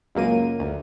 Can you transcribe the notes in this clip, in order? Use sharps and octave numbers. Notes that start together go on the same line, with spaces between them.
C#2 F#2 A#3 D#7
D2